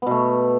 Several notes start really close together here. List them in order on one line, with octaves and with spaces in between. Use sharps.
B3 B2 A3